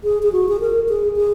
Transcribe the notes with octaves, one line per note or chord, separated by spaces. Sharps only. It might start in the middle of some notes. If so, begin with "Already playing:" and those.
G#4
G#4
F#4
G#4
A#4
G#4
G#4